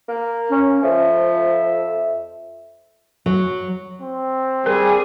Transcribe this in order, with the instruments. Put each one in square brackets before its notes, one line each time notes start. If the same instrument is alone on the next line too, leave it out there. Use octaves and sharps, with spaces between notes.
[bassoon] A#3
[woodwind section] C#4
[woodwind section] F2 E5 [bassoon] F3
[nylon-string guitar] F#3
[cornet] C4
[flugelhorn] G3 [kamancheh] G#4 [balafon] A#4